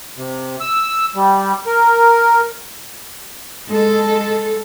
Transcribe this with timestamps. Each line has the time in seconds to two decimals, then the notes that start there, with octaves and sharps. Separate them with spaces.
0.17 C3
0.60 E6
1.15 G3
1.66 A#4
3.66 G#3 A4